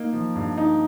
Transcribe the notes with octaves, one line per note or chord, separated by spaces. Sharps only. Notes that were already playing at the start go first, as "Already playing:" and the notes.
Already playing: A#3 D#4
F3
G2
D#4